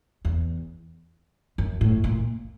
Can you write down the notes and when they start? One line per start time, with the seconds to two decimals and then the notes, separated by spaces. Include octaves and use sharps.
0.25 E2
1.58 F#2
1.81 A2
2.04 A#2